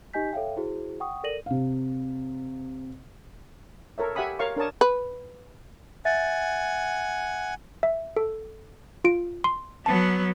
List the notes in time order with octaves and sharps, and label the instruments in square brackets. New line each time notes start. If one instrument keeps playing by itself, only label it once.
[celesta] D#4 G4 D#5 G#5 G6 B6
A4 C#5 E5 F5 G5
E4 F#4 G#4 C5
F#5 G5 C#6 D#6
A4 A#4 D5 A#6 D#7 F#7
[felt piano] C3 F5
[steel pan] A4 A#4 C#5 E5
G4 E5 F#5 G#5 B5 D#6
A#4 C#5 F5 C#6
D4 A#4 C#5 A5 D#6
[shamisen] B4
[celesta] E5 A6 [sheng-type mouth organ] F#5 G#5
[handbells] E5
A4
F4 D7
C6
[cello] F#3 B3 [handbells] A5